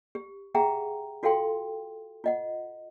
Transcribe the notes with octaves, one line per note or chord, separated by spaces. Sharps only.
G4
G4 G#4 E5 F#5 G5 A#5
F4 F#4 A4 F5 G5 C6
F4 D#5 F#5